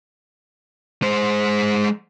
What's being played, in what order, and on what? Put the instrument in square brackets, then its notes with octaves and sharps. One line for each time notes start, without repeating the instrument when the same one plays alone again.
[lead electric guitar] G#3 C5